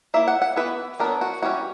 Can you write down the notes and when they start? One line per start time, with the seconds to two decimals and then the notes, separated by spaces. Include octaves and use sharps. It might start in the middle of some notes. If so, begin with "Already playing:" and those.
0.14 A#3 E4 E5
0.28 F#5
0.42 F#5
0.56 E3 B3 E4 B4
1.00 F#3 B3 D4 A#4
1.21 F#4
1.43 E3 G3 C#4 F#4